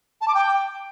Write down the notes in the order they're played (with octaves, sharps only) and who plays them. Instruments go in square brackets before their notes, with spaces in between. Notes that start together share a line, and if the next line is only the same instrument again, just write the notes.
[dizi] A5
D6
G5